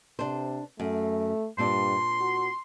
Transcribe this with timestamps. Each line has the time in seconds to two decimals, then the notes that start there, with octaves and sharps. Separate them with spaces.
0.19 C3 D4 C5
0.80 F#2 A3
1.58 G2 A#2 C4 D4 C6
2.20 F#4